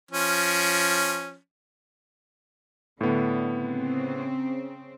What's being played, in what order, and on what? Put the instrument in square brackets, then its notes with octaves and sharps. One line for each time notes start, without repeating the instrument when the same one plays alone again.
[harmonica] F3 C#4
[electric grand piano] A2 B3 [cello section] D3
[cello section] C#3 C4